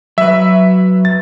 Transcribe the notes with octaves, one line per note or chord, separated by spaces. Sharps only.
F#3 B4 E5
A6